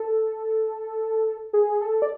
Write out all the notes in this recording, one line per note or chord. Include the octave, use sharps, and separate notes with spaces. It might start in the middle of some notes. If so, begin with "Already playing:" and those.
Already playing: A4
G#4
A4
D5